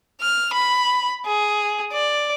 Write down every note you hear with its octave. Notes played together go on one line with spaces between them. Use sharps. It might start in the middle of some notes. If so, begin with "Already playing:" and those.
F6
B5
G#4
D5